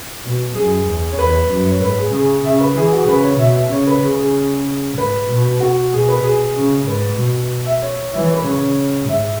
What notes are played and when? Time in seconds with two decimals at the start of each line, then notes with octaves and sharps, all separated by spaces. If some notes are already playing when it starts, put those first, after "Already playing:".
0.24 B2
0.55 F#2 G#4
0.87 E2
1.12 C#5
1.18 E2 B4
1.49 F#2
1.70 C#5
1.82 G#2 B4
1.97 G#4
2.13 C#3 G#4
2.45 C#3 E5
2.60 B4
2.76 E3 G#4
2.86 G#4
2.93 F#4
3.01 G#4
3.08 C#3 B4
3.24 C#5
3.39 B2 E5
3.56 E5
3.71 C#3 C#5
3.87 B4
4.03 C#3 G#4
4.19 G#4
4.97 G#2 B4
5.30 B2
5.60 F#4
5.93 B2 G#4
6.08 B4
6.24 G#4
6.56 C#3
6.87 G#2 B4
7.19 B2
7.66 E5
7.82 C#5
8.13 E3 E5
8.24 C#5
8.34 B4
8.43 C#3 C#5
9.09 G#2 E5